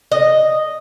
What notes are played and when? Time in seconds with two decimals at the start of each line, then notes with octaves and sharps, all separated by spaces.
0.12 D#5